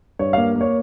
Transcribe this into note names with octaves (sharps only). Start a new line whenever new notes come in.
G2 C#5
A#3 F5
A#3 C#5